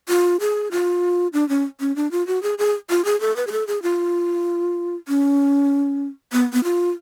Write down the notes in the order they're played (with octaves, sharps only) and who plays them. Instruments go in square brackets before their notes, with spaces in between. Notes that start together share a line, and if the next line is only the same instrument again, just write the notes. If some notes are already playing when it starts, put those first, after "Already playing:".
[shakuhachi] F4
G#4
F4
D4
C#4
C#4
D4
F4
F#4
G#4
G#4
F4
G#4
A4
B4
G#4
A4
G#4
F4
C#4
B3
B3
F4